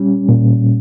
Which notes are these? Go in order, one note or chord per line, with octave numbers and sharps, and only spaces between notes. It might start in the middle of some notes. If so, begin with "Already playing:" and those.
Already playing: G3 C#4
A#2